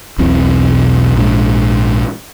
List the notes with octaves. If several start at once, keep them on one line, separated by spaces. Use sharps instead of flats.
E1 B1 E3 C4
A#1 G#2 D4